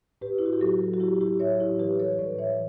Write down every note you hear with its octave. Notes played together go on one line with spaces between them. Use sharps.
A2 G4 B4
E4
A2 F#4
G4
F#3 F#4 A4
F#3
F#4
F#3 E4 G4
A2 E4 G4
F#3 C#5 E5
A2 E4 G4
E3 G4 B4
G3 A4 C#5
A2 B4 D5
E3 C#5 E5